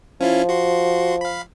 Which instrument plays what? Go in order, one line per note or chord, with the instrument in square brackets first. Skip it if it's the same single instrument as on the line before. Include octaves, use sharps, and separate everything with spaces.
[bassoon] F3 [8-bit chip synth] C#4 E4 F4
[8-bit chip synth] F#4 C6
F5 B5